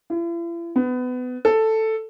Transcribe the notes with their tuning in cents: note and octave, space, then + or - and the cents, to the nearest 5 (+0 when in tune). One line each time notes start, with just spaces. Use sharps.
E4 +45
B3 +25
A4 +5